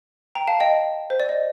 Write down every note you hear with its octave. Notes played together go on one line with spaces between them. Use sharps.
G5 A#5
F5 A5
D#5 G5
C5
D5
D#5